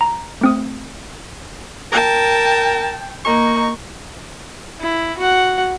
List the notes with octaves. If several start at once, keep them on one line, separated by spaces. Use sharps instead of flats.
A#5
A3 C4 D#6
A#4 G5 A5
A#3 D#4 C#6
E4
F#4 F#5